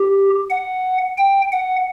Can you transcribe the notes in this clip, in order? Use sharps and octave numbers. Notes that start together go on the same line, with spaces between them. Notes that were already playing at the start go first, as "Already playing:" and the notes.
Already playing: G4
F#5
G5
F#5